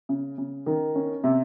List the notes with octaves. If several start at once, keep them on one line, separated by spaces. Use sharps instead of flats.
C#3
C#3
D#3
C#4
C3